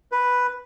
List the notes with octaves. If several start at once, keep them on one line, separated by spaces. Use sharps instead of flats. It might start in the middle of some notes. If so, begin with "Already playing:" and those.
B4